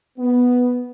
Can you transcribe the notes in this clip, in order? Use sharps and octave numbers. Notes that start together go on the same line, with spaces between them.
B3